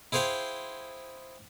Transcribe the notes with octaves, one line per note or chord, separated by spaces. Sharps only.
E4 G#4 C5 F5 G5